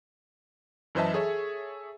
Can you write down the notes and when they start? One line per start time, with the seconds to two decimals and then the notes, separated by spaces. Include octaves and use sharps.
0.95 F#2 E3 C5 D#5 E5 A5
1.14 G#4 A4 C#5 E5